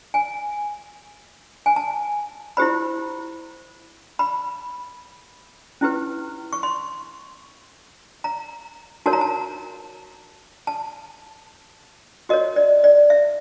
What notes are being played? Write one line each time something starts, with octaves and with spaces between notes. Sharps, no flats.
G#5
G#5
A5
E4 G4 C5 B5
B5
C#4 E4 G4 B4
C#6
C6
A#5
D#4 F#4 A#4 C#5 A5
A#5
A5
A5
F#4 A#4 C#5 D#5
D5
D5
E5